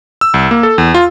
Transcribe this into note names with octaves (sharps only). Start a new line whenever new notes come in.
E6
C2
A#3
A4
E2
F4